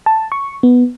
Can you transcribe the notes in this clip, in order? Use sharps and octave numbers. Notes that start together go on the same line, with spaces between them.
A5
C#6
B3